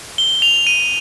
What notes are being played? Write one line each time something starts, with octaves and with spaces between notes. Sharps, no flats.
G7
F7
D#7